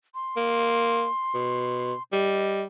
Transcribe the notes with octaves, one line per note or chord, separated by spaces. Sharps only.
C6
A#3
B2
G3 D#5